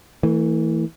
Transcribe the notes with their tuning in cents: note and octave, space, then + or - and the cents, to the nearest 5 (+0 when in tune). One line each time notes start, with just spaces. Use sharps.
E3 -10 A3 +35